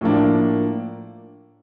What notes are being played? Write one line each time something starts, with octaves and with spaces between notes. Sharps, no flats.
A2 F3 A#3 D4